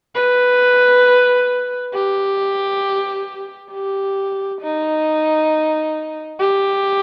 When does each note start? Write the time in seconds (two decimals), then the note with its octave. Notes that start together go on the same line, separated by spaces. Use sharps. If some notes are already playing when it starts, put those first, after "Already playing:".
0.15 B4
1.93 G4
3.72 G4
4.61 D#4
6.39 G4